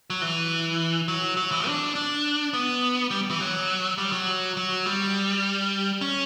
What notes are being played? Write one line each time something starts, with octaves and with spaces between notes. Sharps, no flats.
F#3
E3
F#3
F#3
E3
D4
D4
B3
G3
E3
F#3
G3
F#3
F#3
G3
C#4